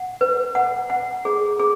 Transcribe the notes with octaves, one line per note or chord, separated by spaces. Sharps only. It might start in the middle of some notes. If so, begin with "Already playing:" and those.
Already playing: F#5
B4
F#5
F#5
G#4
G#4